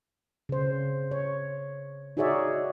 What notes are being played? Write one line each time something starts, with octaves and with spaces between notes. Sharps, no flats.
C#3 C5
C#5
D#4 F#4 G#4 C#5 D5 E5